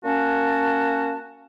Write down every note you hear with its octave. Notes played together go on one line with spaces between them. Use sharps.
A#3 C#4 F#4 A5